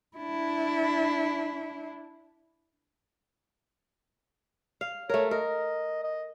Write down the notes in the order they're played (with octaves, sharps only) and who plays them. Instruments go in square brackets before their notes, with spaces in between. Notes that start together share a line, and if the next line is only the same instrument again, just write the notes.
[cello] D4 E4
[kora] F5
[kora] A3 A#4 [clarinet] C#5
[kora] A#4 [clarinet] D#5
[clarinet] D#5